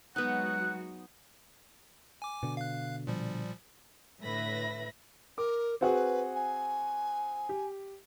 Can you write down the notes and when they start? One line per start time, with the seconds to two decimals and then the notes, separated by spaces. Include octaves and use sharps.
0.16 F#3 G#3 B3 D#4 F#4 F#5
2.22 G#5 D6
2.43 B2 D3
2.57 F5 F#6
3.07 A#2 F3 G3
4.21 A2 D3 B4 E5 B5 A#6
5.38 A#4 D6
5.81 C4 F#4 G#4 B4
6.35 G#5
7.49 G4